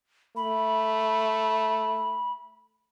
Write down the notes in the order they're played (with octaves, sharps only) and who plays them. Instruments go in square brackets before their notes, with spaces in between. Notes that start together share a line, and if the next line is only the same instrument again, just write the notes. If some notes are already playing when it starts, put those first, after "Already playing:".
[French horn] A3 [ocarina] B5